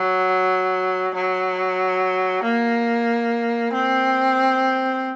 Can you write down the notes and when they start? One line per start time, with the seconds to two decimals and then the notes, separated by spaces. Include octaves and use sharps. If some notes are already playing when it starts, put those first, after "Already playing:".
Already playing: F#3
1.14 F#3
2.43 A#3
3.73 C4